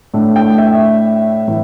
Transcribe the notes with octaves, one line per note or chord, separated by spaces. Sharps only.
A2 A3 D4
G5
E5
A2 E3